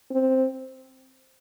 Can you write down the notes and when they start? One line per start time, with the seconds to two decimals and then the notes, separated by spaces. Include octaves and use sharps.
0.11 C4